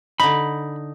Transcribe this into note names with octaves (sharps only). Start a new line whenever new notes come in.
D3 D#4 B5